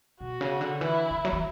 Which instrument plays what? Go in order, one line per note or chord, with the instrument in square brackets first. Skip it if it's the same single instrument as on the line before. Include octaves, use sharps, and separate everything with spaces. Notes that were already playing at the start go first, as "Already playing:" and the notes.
[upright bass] B2 [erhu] F#4
[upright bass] C#3
D3
[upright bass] E3 [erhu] E4
[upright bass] D3
F#3
E3